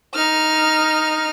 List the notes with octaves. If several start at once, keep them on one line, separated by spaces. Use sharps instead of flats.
D#4 F6